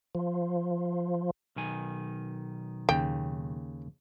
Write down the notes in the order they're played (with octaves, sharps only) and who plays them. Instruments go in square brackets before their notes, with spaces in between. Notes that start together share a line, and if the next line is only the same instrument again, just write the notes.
[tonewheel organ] F3
[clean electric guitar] B1 D#3 G#5
[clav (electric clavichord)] D#2 C#3 [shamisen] G5